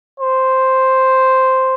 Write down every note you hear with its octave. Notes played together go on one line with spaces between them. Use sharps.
C5